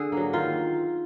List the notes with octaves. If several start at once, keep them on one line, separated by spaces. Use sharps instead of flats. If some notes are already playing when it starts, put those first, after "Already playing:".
Already playing: D3 G#4
F#3 A#3
D#3 F4